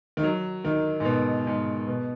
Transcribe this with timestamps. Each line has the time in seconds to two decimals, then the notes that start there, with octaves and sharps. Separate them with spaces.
0.17 D#3
0.23 F#3
0.64 D#3
1.00 G#2
1.05 B2
1.47 G#2
1.88 B2